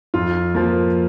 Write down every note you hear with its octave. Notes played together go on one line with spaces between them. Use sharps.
F2 F4
F3 A#3